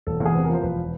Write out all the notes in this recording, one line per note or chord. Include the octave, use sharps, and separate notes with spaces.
E1 A4
E2
G#4
C3 B4
A#4
F3 C5
E1 B4